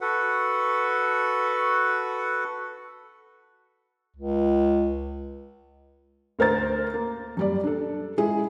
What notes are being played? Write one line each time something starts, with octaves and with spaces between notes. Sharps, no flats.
F#4 A4 B4 F#5
C#2
D2 A#4 C5 A6
A#3
F#2 G3 D5
D4 A4
G#3 E4 G#4